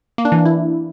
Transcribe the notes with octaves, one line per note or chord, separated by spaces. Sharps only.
A#3
D4
E3
D4
E4